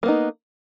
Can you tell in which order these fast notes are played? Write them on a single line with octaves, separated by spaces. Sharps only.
A#3 B3 D#4